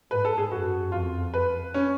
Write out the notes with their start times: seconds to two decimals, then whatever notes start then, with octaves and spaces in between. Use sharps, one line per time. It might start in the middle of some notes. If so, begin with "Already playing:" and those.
0.10 G#2 B4
0.25 A4
0.38 G#4
0.51 F#2 F#4
0.92 F2 F4
1.34 B4
1.74 C#4